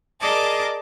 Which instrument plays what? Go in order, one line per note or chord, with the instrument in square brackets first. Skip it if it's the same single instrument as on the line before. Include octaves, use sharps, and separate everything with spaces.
[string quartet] G#4 A#4 D5 D#5 A5 D6